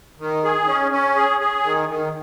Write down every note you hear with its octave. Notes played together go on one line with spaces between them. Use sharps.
D#3
G#4
C#4
C#4
G#4
G#4
D#3
D#3